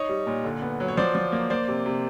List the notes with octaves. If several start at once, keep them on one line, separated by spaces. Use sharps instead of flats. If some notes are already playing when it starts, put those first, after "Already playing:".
Already playing: D#4 C#5 D#5
G3
A#2
D3
B3
F#3
C#5
F3 C5 D5
F3
A#3
A#3 C5 D5
C3
C3